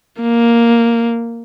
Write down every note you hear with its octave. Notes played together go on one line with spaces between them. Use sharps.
A#3